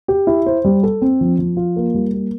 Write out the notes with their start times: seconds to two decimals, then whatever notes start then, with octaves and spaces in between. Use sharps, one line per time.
0.08 G4
0.27 E4
0.46 C5
0.65 G3
0.83 A4
1.02 C4
1.21 F3
1.39 F3
1.57 F4
1.76 A#3
1.94 G3
2.13 A#3